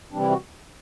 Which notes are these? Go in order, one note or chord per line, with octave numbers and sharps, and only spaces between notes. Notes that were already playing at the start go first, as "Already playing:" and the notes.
C3 E3 G3 C4 D4
E4
F#4